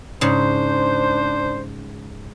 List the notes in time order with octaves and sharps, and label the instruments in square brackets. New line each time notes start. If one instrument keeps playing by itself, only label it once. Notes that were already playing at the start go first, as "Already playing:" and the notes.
[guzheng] G#2 C#3 [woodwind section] D4 C5